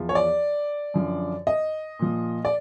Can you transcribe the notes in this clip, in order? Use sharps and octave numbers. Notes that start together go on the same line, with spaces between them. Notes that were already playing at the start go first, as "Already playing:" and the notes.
Already playing: E2 F3
C#5
D5
F#2 D3 F3
D#5
A#2 F3
D5